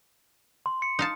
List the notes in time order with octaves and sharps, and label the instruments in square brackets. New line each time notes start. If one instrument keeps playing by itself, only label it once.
[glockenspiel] C6
C#7
[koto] D#4 F5 A5